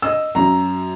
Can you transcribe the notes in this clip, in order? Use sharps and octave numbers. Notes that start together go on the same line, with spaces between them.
D#5 E6
F#2 A#5